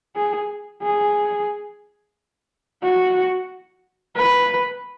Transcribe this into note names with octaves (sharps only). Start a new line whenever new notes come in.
G#4
G#4
F#4
B4